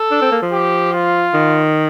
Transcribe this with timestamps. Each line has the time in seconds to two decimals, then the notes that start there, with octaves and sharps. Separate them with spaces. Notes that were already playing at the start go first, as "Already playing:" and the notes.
Already playing: A4
0.11 D4
0.21 C4
0.32 A#3
0.42 F3
0.52 G4
0.93 F4
1.34 D#3